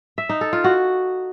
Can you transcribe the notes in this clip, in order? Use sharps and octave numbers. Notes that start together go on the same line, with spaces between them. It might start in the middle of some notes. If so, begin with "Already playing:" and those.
E5
D#4
A4
F4
F#4